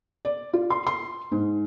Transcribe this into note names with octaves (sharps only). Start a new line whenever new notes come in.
D5
F4
C6
C6
G#2